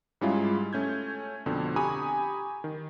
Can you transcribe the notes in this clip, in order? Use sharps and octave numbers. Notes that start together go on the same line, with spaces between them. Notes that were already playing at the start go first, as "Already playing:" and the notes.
G#2 G3 G#3 C#4 E4 F4
A3 C#4 G6 G#6
F2 B2 D3
G4 G#5 A#5 B5 C#6 D#6
D#3